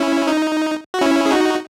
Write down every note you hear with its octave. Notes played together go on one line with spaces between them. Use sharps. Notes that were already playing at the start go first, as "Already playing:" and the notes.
Already playing: C#4 E4
D#4
F#4
C#4 E4
G#4
D#4 F#4